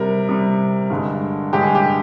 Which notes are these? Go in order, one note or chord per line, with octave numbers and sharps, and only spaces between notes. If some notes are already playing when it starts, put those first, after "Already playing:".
Already playing: C3 G3 A#4
C3 G3
G2 D3 G#3
G2 D3 G#3 G4
G#4
G4